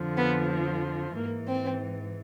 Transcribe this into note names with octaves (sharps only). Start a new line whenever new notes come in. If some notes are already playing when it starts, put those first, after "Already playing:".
Already playing: F2 D3 F3
B3
G#2 E3 A#3
C4